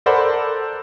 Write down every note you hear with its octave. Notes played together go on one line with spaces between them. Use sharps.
A4 A#4 C5 D5 F#5 B5